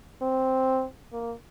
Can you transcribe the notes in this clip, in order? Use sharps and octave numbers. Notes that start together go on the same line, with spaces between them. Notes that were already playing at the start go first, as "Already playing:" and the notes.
C4
A#3